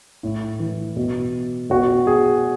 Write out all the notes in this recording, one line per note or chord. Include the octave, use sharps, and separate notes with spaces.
A2
E3
B2
B2 F#4
G#4